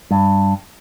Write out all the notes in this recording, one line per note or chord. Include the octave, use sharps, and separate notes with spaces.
G2